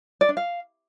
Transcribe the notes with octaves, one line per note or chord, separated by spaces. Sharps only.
D5
D4
F5